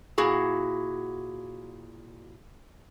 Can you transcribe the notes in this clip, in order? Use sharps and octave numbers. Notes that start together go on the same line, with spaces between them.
A#2 E4 F#4 G#4